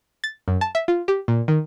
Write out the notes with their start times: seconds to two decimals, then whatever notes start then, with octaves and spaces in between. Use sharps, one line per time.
0.24 A6
0.48 F#2
0.61 A5
0.75 E5
0.88 F4
1.08 G4
1.28 A#2
1.48 D#3